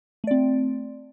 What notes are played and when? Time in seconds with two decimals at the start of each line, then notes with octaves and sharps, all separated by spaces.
0.24 A3
0.27 D5
0.31 C4